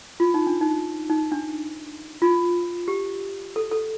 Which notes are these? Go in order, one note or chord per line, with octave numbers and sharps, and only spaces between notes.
F4
D#4
D4
D#4
D#4
D4
F4
G4
A4
A4